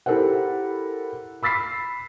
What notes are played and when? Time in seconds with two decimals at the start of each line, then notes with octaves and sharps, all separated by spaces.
0.06 E4 G4 A4 A#4 C5 F#5
1.43 B5 E6 A6 B6 C7